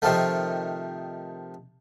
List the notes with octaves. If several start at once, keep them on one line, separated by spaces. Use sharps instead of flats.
C3 D#3 F3 A3